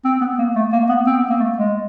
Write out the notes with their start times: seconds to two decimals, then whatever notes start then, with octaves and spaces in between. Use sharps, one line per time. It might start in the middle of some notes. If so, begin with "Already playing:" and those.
0.05 C4
0.21 B3
0.38 A#3
0.55 A3
0.72 A#3
0.89 B3
1.06 C4
1.18 B3
1.30 A#3
1.40 A3
1.58 G#3